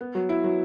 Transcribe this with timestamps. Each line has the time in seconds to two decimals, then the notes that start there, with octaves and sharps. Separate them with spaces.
0.01 B3
0.15 F#3
0.29 E4
0.44 F#3